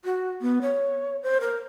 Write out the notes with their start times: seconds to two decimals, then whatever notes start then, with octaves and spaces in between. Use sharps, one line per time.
0.05 F#4
0.41 B3
0.62 C#5
1.23 C5
1.41 A#4